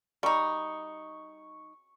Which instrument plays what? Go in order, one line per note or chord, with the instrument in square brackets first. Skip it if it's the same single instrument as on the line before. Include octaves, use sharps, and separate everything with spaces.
[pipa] G3 D#4 [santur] C#6